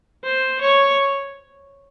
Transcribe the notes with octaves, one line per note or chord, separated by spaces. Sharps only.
C5
C#5